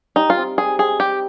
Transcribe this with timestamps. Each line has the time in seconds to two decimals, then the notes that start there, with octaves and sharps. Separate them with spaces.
0.16 G3 D#4
0.30 F4
0.37 C4 D#4
0.58 G3 G#4
0.78 C4 D#4 G#4
0.99 G3 G4